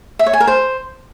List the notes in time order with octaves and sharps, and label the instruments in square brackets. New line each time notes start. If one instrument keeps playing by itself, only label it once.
[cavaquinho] E5
C#5
G#5
A#4
C5